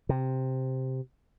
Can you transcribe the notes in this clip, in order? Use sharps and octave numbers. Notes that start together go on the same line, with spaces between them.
C3